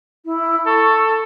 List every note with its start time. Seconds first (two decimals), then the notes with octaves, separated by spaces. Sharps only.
0.25 E4
0.67 A4 C#6